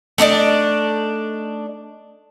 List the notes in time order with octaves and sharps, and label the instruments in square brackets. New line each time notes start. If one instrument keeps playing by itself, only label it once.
[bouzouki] A3 D4 D#4 D5